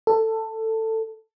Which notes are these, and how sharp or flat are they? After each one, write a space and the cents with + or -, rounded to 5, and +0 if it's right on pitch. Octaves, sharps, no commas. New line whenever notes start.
A4 +15